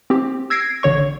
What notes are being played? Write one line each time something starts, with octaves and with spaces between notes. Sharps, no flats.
C4 G4
E6 G#6 A#6 C7 D7
A1 D3 C#5 C#6